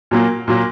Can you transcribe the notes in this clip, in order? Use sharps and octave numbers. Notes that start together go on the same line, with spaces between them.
A#2 F#3 A#3
A#2 F#3 A#3